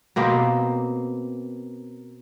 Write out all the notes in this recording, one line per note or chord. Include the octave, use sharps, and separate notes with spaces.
B2 A#3 C4 G4